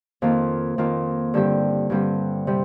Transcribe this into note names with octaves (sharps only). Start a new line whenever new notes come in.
F2 D#3 A#3 F4
F2 D#3 A#3 F4
G2 D3 G3 C4 G4
G2 D3 G3 C4 G4
C3 G3